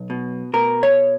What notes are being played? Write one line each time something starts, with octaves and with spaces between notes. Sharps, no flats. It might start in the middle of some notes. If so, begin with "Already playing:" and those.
Already playing: B1
B2
B2 A#4
C#5